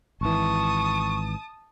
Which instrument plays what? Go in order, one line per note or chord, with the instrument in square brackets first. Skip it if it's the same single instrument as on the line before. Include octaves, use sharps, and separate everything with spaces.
[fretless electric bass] G#1 E3 [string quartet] A5 D#6 [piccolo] C#6